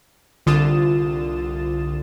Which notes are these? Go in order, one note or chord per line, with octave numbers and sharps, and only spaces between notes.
C2 D3 F4 D#6 A6 E7